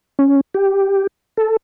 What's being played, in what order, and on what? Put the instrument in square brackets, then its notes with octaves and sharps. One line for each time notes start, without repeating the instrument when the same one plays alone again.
[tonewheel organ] C#4
G4
A4